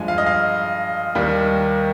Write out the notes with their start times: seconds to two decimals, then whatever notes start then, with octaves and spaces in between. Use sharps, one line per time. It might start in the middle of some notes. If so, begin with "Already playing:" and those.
Already playing: G2 F3 G#3 G#5
0.08 F5
0.18 D#5
0.26 F5
1.15 D#2 D#3 G3